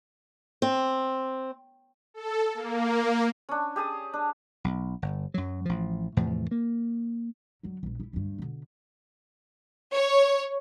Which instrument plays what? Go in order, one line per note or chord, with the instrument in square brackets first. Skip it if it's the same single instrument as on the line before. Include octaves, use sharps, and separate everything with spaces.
[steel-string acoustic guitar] C4
[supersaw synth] A4
A#3
[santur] C#4 D4
G4 G#4 A5 D#6
D4
[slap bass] B1
G1
F#2 F#3
A1 F3
E2 A2 C3 F3
A#3
[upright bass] D3 F#3
A#1 E2
D#4 E4
D2 G2
B2 D3
[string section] C#5